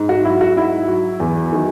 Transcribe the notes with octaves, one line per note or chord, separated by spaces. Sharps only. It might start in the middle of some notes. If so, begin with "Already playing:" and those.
Already playing: G#2
F#4
F#3 E4
F#4
G#2 E4
F#3
E2
D#3 F#3